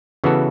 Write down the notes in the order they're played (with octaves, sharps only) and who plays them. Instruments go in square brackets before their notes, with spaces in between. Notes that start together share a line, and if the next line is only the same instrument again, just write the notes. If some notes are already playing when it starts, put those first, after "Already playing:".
[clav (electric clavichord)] C#3 E3 B3 F#4 A4